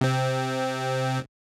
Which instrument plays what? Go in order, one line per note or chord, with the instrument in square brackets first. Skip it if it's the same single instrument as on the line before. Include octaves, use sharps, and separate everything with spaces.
[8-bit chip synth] C3 C4